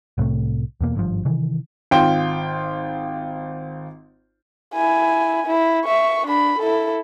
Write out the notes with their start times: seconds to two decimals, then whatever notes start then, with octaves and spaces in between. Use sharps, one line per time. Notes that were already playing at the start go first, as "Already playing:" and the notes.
0.18 C2 A2 C3 A3
0.81 E2 B2 A#3
0.95 G#1 G2 F3
1.25 C3 D#3 E3
1.91 G#1 F4 G5 C6
4.74 E4 G#5
5.47 E4
5.85 E5 C#6
6.27 D4 B5
6.59 E4 A4